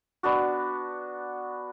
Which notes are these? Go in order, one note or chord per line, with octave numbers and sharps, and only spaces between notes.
B3 D4 F#4